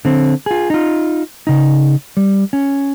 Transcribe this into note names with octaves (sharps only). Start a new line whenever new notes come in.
D3 C4
F4 G#4
D#4 F4
C#3 D#4
G3
C#4